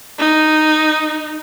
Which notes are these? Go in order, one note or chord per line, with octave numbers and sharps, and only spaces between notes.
D#4